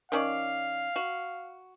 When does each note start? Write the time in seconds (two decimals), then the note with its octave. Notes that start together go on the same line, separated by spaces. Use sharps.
0.12 D#3 C#4 D5 F5
0.96 F#4